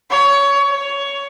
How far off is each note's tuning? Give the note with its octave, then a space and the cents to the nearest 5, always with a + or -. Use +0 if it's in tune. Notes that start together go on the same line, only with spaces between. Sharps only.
C#5 +20
C#5 +15